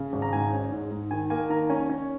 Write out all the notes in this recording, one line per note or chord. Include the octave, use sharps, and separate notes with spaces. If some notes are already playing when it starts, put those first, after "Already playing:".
Already playing: C#3
G#1
A#5
G#2 G#5
C#4
G#2
G#2
D#3 G#5
A#3 G#5
D#3 A#5
C#4 G#5
C#4